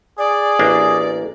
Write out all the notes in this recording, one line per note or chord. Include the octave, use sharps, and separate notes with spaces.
G#4 D5
A1 A#3 D4